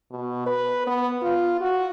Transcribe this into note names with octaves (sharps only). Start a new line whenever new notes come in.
B2
B4
B3
F4
F#4